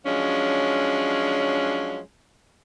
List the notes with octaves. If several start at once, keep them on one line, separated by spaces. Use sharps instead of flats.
F3 F#3 G#3 C#4 D4